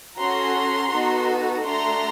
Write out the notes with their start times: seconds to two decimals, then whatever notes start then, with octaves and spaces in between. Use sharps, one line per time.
0.19 C#4 F#4 A4 A#5 C6
0.92 B3 D#4 F#4 A4
1.64 A3 D4 F#4 A4 A#5 C6